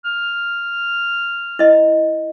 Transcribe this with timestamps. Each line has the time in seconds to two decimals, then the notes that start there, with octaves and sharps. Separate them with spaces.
0.05 F6
1.59 E4 D#5